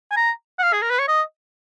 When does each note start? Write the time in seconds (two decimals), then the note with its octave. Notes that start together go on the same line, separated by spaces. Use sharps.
0.11 G#5
0.17 A#5
0.59 F#5
0.63 F5
0.73 G#4
0.82 A#4
0.90 B4
0.99 C#5
1.08 D#5